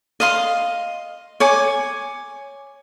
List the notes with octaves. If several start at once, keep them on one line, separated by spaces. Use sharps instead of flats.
D#5 F5 C6
C#5 G#5 D6